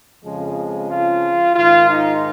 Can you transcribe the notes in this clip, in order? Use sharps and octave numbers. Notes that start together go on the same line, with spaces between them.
F2 C#3 F3 G#3
F4
G#2 D#3 F4
D#4